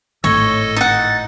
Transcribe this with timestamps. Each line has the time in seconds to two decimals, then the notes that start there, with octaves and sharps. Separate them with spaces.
0.24 G#1 A2 D#3 A4 C#5 D#5
0.76 D#4 F#5 A6